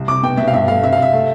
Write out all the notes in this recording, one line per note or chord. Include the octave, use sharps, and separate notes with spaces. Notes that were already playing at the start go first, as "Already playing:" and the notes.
Already playing: C2
C3 D6
B2 G5
B2 E5
F5
G2 E5
A3 F5
C3 E5
F5
C3 E5
A3